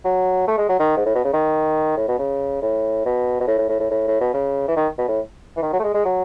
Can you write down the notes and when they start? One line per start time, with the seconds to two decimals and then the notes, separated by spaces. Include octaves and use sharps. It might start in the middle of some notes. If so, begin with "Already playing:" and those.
0.05 F#3
0.48 A3
0.58 G#3
0.69 F#3
0.79 D#3
0.96 G#2
1.06 A2
1.15 B2
1.25 C#3
1.33 D#3
1.97 A2
2.08 B2
2.19 C#3
2.62 A2
3.05 B2
3.40 B2
3.47 A2
3.58 A2
3.69 A2
3.80 A2
3.91 A2
4.08 A2
4.21 B2
4.34 C#3
4.68 E3
4.76 D#3
4.98 B2
5.08 A2
5.57 E3
5.62 D#3
5.73 F#3
5.79 A3
5.83 G#3
5.94 G#3
6.05 F#3